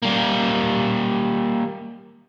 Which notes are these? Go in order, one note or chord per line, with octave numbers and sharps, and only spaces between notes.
G3 A#3